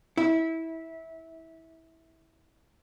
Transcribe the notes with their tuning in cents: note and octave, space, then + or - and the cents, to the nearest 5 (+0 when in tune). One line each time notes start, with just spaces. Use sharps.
E4 -20